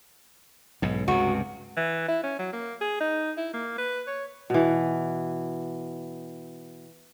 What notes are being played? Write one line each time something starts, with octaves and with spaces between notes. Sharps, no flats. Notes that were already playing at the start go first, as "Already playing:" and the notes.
B1 G#2
C#2 G2 C3 F#4
E3
E4
C#4
F#3
A#3
G#4
D#4
E4
A#3
B4
C#5
B2 E3